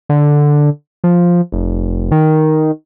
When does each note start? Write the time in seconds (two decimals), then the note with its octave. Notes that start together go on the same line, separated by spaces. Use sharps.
0.09 D3
1.04 F3
1.52 F1
2.12 D#3